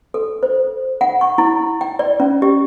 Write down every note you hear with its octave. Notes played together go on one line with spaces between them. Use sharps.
A4
C5
F#5
C#6
E4
G5
D5
C#4
G4